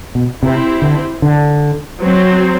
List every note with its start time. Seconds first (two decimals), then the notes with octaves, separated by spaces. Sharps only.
0.15 B2
0.42 C3 C4 E4 G4 C5
0.82 D3
1.22 D3
2.01 F#3 C4 F#4 C5